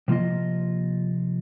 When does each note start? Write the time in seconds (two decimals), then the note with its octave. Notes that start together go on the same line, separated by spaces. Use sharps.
0.08 C3 F3 A#3 F4 D#5